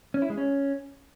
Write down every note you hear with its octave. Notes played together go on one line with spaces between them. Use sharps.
C#4
E4
G#3
C#4